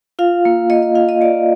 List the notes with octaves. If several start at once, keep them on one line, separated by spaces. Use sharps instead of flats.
F4 F5
A#3
A#3 D#5
D#5
F4 F5
D#5
A#3 D5